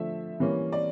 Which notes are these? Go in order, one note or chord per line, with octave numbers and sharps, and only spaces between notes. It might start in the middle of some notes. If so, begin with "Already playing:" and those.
Already playing: D3 F3 A3 E5
E3 G3 A#3 C#4
D5